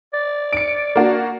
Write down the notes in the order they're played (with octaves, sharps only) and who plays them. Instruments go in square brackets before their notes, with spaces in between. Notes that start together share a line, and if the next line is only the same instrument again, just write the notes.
[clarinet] D5
[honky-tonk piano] C#7 D7
A#3 D4 F#4